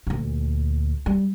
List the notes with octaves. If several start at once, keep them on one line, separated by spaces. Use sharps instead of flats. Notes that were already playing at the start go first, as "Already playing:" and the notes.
D2 A#2
G3